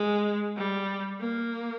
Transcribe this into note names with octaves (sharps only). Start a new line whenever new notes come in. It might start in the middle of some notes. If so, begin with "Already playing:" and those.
Already playing: G#3
G3
A#3